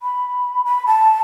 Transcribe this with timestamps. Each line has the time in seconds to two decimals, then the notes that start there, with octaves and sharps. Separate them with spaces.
0.02 B5
0.65 B5
0.87 A5